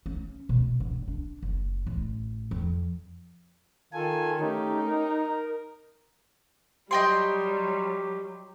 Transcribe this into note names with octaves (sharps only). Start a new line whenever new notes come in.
C#4
B2
G2
D4
F#1
A1
F2
D#3 F4 A4 G#5
A3 C#4 D#4 G4
A#4
F#3 G3 G4 D#5 G5 C6